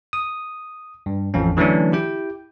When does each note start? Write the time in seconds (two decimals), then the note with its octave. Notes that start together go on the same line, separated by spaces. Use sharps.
0.13 D#6
1.06 G2
1.34 A1 F2 C#4
1.57 D3 E3 F#3 A3 C#4 D4
1.92 E4 G4 G5